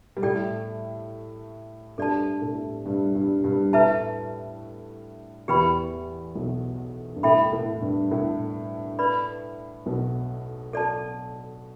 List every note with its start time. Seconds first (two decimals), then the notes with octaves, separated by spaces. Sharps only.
0.17 G3
0.22 A2 A3 A4 D5 G5
1.98 G2 G3 A4 D5 A5
2.41 A2 A3
2.85 G2 G3
3.15 G2 G3
3.44 G2 G3
3.73 A2 A3 E4 B4 E5 A5
5.48 E2 E3 G4 B4 G5 B5
6.35 B1 B2
7.16 G2
7.23 A2 A4 E5 G5 B5
7.53 A2
7.82 G2
8.11 A2
8.99 B4 D5 B5
9.86 B1 B2
10.73 A4 D5 A5